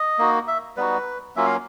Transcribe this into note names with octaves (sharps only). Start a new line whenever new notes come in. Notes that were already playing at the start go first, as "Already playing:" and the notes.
Already playing: D#5
A#3 D#4 F#4
E5
G3 B3 D#4 F#4 B4
F#3 A#3 C#4 F4 E5
F5